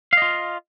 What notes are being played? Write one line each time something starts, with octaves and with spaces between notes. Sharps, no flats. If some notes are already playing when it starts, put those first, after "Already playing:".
F4 D#5 F5